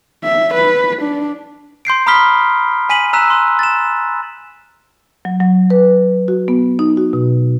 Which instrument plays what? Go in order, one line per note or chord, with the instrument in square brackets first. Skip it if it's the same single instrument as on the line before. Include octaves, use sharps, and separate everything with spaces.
[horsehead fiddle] E5
B4
D4
[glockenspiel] C6 G6 C7 D7
A#5 B5 D#6 F6 B6 G7
G#5 B6 D#7 F#7
A#5 E6 F#6 B6 E7
C6
A6 E7
[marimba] F#3
F#3
B4
F#4
B3
D#4
F#4
B2